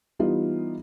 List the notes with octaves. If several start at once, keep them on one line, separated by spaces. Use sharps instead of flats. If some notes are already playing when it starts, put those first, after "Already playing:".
E3 G3 B3 D#4 F4